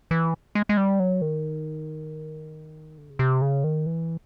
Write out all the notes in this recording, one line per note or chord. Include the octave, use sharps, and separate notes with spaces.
E3
G#3
G#3
G3
F#3
D#3
D3
C#3
C3
C#3
D#3
E3